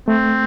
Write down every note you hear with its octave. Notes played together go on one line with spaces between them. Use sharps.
A3 C4